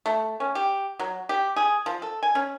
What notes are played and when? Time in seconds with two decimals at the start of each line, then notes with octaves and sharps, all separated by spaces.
0.06 A3
0.40 C#4
0.55 G4
0.99 F#3
1.29 G4
1.56 G#4
1.86 F3
2.02 A4
2.23 G#5
2.35 C#4